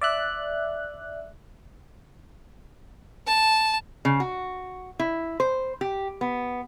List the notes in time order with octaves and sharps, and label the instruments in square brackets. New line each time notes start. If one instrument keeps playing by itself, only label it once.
[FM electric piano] D5 E5 F#6
[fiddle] A5
[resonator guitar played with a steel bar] C#3
F#4
E4
C5
G4
B3